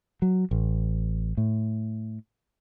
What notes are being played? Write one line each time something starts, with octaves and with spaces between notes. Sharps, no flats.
F#3
A1
A2